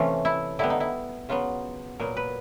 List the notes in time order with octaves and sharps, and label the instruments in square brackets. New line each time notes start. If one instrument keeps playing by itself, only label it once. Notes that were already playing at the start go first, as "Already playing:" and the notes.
Already playing: [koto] C3 E3 A3 C#4 F4
E4
D3 G3 B3 E4
D#4
E4
C#3 F#3 B3 F4
A#2 F#3 B3 A#4
B4